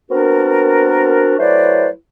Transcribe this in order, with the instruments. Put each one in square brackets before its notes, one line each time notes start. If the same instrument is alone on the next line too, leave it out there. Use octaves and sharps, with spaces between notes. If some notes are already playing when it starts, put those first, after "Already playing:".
[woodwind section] B3 C4 D4 F#4 A#4
F#3 A3 E4 B4 C5 D5